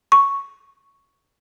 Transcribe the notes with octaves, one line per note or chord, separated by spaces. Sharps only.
C#6